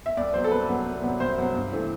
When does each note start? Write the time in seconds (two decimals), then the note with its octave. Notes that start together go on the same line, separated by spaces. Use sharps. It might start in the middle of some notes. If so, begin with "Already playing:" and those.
0.06 E5
0.17 C2 D5
0.34 C3 F#3 B3 C5
0.44 A4
0.52 C2 B4
0.68 C3 F#3 B3
0.86 C2
1.02 C3 F#3 B3
1.20 C2 C5
1.38 C3 F#3 B3
1.54 G2
1.72 E3 A3 C4